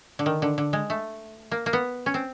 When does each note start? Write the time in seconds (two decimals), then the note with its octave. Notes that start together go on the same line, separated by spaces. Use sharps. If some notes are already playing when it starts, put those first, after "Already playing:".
0.19 D3
0.26 D#3
0.42 D3
0.58 D3
0.73 G#3
0.90 A3
1.51 A#3
1.66 A#3
1.73 B3
2.06 C#4
2.14 C4